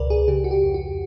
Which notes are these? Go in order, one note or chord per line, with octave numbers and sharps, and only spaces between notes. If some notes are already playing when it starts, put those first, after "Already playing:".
Already playing: C#2 B2 A#4 B4 D5
G#4
C#3 G4
F#4
G4
F2
F#4